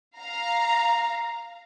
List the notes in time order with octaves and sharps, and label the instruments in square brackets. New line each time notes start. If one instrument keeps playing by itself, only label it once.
[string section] F5 A#5